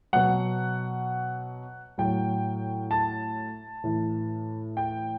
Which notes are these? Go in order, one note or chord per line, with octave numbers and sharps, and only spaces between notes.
B2 F#3 F#5
A2 F#3 G5
A5
A2 E3
G5